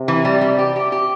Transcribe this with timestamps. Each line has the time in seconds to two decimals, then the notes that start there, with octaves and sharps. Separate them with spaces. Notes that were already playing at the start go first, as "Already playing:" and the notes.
Already playing: C3
0.08 E3
0.25 G3
0.41 G3
0.58 G4
0.76 G4
0.92 G4